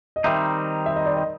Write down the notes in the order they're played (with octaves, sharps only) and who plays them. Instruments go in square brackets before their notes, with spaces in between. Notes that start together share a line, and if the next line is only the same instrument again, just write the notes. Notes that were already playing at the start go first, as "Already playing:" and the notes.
[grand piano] D#5
[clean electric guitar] D#3 G3 C4 D#4 [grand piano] E5
[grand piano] E5
D#5
D5
D#5